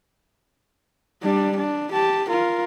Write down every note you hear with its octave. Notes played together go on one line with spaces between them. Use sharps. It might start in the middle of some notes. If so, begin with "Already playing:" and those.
G3 D4
D4
G4 A5
F4 A#4